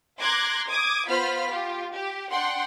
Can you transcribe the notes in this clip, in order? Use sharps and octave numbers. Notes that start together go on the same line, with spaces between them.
A#5 C6 D6 F#6 G#6 A#6
D6 D#6 G#6
B3 F4 C5 B5 F6 B6
F4 G4
G4
D4 F#5 G5 C6